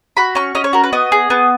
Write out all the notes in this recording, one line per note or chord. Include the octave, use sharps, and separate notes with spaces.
F#4 B5
C#4 C#6
C#4 D#5
C#5
F#4 A#4
B4
B3 D#5
G#4
B3